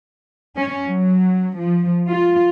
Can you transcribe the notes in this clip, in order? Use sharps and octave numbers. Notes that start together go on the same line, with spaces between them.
C#4
F#3
F3
F4